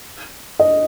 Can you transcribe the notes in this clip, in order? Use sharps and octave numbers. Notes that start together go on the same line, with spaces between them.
D#5